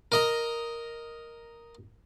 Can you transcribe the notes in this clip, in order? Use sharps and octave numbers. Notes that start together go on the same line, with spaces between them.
A#4 D#5 A#5